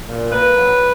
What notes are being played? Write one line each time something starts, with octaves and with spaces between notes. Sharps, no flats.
A#2
A#3 B4
F#3